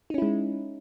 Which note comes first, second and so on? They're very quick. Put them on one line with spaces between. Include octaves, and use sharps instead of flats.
D#4 C#4 E4 G#3